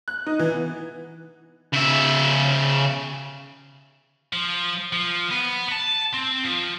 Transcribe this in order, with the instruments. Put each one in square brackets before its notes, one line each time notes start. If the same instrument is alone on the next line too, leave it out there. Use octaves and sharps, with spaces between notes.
[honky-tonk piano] F#6
D#4
E3
B3
[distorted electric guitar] C#3 E5
F3
F3
B3
A5 B5
C4
F3